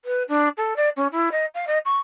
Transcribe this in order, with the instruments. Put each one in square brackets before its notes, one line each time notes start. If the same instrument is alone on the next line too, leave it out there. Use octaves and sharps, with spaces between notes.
[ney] B4
D4
A4
D5
C#4
E4
D#5
F5
D#5
C#6